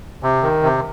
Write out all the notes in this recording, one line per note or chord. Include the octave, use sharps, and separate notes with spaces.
C3
D#3
C3